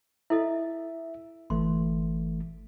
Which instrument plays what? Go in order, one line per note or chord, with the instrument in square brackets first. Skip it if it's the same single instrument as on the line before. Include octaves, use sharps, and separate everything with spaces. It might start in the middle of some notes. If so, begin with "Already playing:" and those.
[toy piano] E4 A4 D#5 [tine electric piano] E5
[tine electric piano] G1 E3 A3 [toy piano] C6